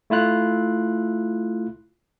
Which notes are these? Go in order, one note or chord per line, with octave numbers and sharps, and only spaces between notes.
A3 E4 F4 F#6